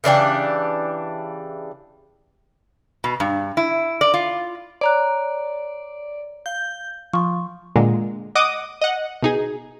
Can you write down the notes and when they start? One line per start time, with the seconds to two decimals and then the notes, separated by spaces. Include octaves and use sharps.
0.04 C#3 E3 D4 G4
3.04 B2
3.20 G2
3.57 E4
4.01 D5
4.14 F4
4.81 C#5 D5 A#5 F#6
6.46 F5 G6
7.14 F3 C6 C#6
7.76 A#2 D3 G#3
8.35 D#5 F#5 D6 D#6
8.81 D#5 F#5
9.22 B2 D#4 G#4